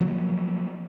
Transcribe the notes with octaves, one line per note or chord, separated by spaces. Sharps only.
F3 F#3 A#3